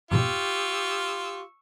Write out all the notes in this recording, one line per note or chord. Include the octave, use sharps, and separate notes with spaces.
F2 G#2 B2 F4 G4 C#6 E6